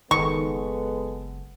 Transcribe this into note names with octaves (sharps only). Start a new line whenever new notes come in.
F#1 D#3 G#3 B3 A4 C#6